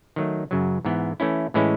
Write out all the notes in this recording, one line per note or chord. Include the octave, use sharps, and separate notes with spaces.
D#3 F#3 A3
F#2 C#3 F#3
G#2 E3 B3
E3 A3 C#4 E4
A2 E3 G#3 C#4 E4